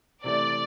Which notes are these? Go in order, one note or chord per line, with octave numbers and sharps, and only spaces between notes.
C3 E3 A3 D5